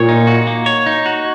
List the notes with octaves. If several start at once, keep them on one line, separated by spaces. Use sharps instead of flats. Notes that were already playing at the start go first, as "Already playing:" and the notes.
Already playing: A#2 C#5
D#4
F#4
A#3
C#5
D#4
F#4